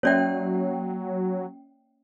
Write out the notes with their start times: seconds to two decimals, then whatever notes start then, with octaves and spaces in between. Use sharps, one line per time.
0.03 F#3 A#3 C#4 C#5 D5 E5 G5